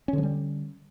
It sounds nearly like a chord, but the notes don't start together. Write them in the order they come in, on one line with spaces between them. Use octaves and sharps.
C#4 D3 F3 G3